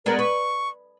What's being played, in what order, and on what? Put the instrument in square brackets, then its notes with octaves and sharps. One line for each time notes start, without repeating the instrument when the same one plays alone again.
[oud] G#3 B3 D4 [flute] A#4
[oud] B4 [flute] C#6